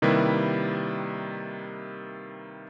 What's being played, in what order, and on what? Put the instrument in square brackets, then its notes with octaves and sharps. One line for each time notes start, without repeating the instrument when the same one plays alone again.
[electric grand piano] C3 D#3 G3 A#3 E4 B4